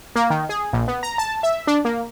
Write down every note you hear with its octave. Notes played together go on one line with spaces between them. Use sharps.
A#3
D#3
G#4
A#1
B3
A#5
A5
E5
D4
A#3